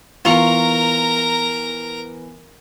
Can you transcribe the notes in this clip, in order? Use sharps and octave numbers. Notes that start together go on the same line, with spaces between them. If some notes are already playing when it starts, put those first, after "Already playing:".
E3 B3 F4 A#4 A#5 C#6 F7